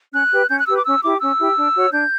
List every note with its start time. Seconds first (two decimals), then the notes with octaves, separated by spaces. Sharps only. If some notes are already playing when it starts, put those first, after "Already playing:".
0.14 C#4 F#6
0.32 G4 B4
0.49 C#4 G6
0.58 F#6
0.67 G4 B4 E6
0.77 D6
0.85 C#4 E6
1.03 E4 G4 D6
1.21 C#4 E6
1.38 E4 G4
1.56 D4
1.74 F#4 C#5
1.92 D4 G6